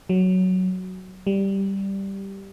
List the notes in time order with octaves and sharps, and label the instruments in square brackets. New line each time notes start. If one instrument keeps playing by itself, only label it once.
[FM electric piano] F#3
G3